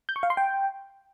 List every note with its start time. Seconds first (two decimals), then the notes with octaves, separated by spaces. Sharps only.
0.09 G6
0.16 C#6
0.23 F5
0.30 C6
0.37 G5